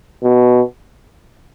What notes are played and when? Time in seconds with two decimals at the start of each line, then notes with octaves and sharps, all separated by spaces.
0.24 B2